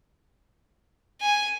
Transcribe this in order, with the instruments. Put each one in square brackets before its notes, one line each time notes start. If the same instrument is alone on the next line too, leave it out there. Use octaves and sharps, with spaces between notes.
[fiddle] G#5